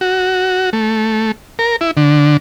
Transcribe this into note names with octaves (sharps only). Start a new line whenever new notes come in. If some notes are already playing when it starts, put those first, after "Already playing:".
F#4
A3
A#4
E4
D3